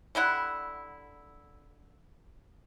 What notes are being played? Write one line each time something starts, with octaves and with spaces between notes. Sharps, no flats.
D3 G3 E4 F#5